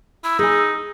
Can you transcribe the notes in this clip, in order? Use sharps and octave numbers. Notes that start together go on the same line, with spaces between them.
E4 E6
D#4 G#4 G#5